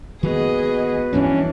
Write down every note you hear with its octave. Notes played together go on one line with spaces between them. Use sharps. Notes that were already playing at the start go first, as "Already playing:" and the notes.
D#3 G#3 A#3 B3 F#4 G#4 B4 D#5
G2 E3 F3 A#3 C#4 D4